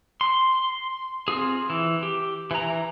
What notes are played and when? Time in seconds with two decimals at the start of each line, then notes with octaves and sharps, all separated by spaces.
0.21 C6
1.28 C4 F4 G#4
1.70 E3
2.03 G4
2.51 E3 A#5